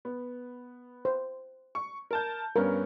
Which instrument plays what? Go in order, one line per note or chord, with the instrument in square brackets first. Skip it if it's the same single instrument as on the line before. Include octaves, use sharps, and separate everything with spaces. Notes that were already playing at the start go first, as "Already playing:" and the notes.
[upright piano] B3
[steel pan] C5
[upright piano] C#6
A#4 A5 G6
[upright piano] G2 B3 C#4 [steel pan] A#4